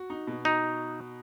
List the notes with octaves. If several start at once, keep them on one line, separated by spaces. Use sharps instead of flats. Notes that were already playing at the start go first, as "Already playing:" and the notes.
Already playing: F#4
D#4
B2
D#4 F#4